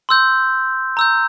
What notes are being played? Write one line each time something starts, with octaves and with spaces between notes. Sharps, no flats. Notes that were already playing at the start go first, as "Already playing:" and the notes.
C6 E6 G6
A#5 E6 G6